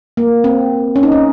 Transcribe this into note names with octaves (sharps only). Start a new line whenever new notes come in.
A#3
C4
C#4
D#4
C#4